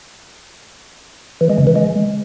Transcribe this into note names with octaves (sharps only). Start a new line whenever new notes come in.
E3
G#3
C#3
E3
G#3